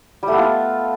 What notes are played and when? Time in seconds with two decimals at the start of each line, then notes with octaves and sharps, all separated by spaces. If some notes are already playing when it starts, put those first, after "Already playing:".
0.23 G3
0.28 A3
0.33 B3
0.38 F4